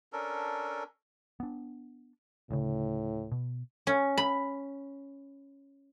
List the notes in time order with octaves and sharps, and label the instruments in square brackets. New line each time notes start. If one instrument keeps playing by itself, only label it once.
[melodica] C#4 D4 A4 A#4
[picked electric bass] B3 D4
[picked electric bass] D2 C#3 [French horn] A2
[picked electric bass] B2
[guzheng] C#4
B5